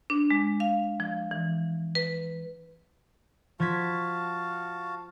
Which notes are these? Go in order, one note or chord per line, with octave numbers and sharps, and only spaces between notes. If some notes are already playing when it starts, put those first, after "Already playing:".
D4
G#3
F5
F3
E3
B4
F3 F#4 F5 A5 G#6 B6